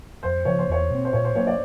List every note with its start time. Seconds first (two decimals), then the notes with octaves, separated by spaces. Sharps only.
0.23 F2 C5
0.45 C#3 F3 C#5
0.59 C5
0.68 E2 C#5
0.90 B2 G#3 C4
1.05 C5
1.13 A#2 C#5
1.24 C5
1.35 F#3 A#3 D4 C#5
1.47 D5